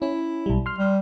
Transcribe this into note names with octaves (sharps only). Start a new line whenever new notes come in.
C#4 E4
B1 G3
C6 F6
G3